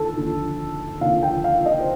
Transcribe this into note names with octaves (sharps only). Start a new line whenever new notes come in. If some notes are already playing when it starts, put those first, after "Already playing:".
Already playing: D#2 D3 A4
D#2 D3 F3
D#2 D3 F3 F5
G5
F5
D#5
C5